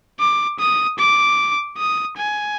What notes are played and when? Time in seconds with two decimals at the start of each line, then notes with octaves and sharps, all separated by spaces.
0.20 D6
0.59 D#6
0.99 D6
1.78 D#6
2.18 G#5